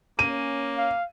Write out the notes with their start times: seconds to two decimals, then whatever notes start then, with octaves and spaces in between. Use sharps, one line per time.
0.19 A#3 C#4 D#7
0.77 F5